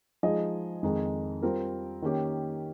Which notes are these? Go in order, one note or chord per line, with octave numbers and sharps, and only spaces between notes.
F3 G#3 D#4 G#4 D#5
F2 D#3 G#3 D#4
G3 C4 F4 A#4
D#3 A#3 C#4 G4